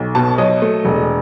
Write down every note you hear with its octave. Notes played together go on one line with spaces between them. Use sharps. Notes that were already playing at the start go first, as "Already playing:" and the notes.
Already playing: B1
B2 A5
F#3 D#5
A3
E1